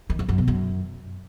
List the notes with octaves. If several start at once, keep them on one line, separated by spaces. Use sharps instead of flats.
D#3
F2
F#2
B2
F#2